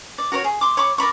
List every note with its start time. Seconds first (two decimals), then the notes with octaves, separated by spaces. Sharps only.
0.18 D5
0.32 F#4 A#4 B4 C#5
0.44 G#4
0.61 C6 D6
0.77 C#5 B5 C#6 D6
0.98 A#4 D5 B5 C#6